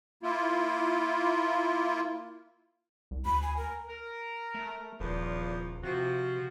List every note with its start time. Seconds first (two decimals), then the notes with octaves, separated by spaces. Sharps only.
0.23 A#3 E4 F4
3.11 C2
3.25 D2 B5
3.42 G#5
3.57 A#4
3.88 A#4
4.54 A3
5.00 D#1 E2 A#2 F3
5.83 C3 F3 F#4